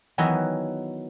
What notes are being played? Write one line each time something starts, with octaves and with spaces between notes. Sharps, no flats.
D#3 E3 F#3 B3 D#5 E5